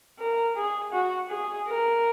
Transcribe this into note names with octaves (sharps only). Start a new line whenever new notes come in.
A#4
G#4
F#4
G#4
A#4